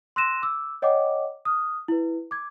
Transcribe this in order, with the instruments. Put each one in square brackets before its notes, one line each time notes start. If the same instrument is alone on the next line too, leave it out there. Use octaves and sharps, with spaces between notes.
[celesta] C6 E6 F#6 A#6 D#7 E7
D6 E6
C#5 D#5 F#5 G5 D6
D#6 F6
E4 B4
D6 G#6